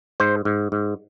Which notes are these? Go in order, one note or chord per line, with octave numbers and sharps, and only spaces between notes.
G#2 C5
G#2
G#2